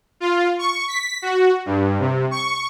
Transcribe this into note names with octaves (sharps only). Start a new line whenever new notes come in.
F4
C#6
B6
F#4
G2
C3
C#6